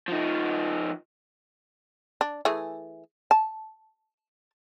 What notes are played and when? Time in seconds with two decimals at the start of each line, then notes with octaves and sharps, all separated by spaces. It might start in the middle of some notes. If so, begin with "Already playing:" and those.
0.08 F3 D#4
2.21 D4
2.45 E3 A3 G#4
3.31 A5